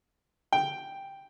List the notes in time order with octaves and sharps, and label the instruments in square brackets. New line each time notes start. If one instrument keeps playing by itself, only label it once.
[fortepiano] G5